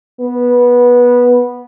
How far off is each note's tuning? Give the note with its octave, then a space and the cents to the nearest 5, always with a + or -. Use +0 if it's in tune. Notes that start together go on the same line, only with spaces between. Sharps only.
B3 -15